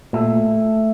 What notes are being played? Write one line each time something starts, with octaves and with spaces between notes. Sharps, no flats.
A#2 A3